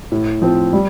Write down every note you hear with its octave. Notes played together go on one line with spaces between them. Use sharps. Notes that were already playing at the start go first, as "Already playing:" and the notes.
A2
F3 C4
G3